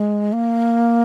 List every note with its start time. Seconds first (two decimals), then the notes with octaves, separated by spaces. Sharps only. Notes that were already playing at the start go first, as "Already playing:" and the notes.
Already playing: G#3
0.33 A#3